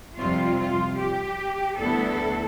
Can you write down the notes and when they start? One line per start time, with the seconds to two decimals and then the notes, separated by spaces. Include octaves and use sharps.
0.17 F2 C3 G3 C4 F4
0.58 F4
0.98 G4
1.78 D2 D3 G3 B3 E4 A4